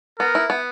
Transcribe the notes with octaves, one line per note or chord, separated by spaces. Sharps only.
B3 A#4
E4
B3